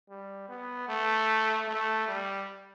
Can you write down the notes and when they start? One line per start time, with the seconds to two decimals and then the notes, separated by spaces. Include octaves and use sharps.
0.09 G3
0.49 B3
0.89 A3
1.68 A3
2.08 G3